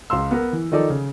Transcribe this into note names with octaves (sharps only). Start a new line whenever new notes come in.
C#2 F5 C6 E6
B3 A#4
E3
D#3 F3 D#4 A4 D5
C#3